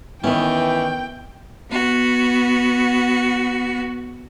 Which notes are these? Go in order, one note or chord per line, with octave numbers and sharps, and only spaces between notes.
D#3 E3 B3 C#4 B4 G5
B3 F#4